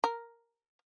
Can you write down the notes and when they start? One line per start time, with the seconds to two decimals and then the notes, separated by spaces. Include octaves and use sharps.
0.04 A#4